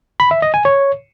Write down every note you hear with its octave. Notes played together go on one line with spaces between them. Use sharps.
B5
E5
D#5
G#5
C#5